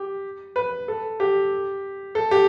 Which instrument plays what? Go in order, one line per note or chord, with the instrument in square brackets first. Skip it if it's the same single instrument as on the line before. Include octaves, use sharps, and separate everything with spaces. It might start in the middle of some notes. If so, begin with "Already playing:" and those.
Already playing: [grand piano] G4
B4
A4
G4
A4
G4